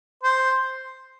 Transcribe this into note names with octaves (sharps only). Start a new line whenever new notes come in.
C5